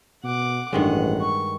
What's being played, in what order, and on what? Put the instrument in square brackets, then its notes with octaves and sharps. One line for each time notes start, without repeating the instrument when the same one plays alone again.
[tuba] B2 [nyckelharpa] F#5 D6
[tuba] A1 [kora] G2 D#3 G#3 [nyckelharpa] F#5
[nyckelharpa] C#6